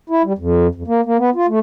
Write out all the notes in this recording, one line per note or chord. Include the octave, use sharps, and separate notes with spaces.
E4
G3
F2
F2
A#3
A#3
B3
F4
A3